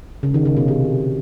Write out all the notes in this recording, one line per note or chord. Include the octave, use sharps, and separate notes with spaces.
C#3
D#3
C#3
B2
C3